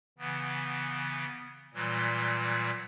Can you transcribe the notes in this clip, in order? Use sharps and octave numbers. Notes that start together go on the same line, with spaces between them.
C#3 E3 B3
A#2 E3 F#3 G3